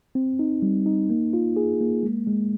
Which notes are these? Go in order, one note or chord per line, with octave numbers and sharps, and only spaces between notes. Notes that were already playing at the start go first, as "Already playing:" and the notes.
C4
D#4
G3
D#4
A#3
F4
G#4
A#3
G#3
G#3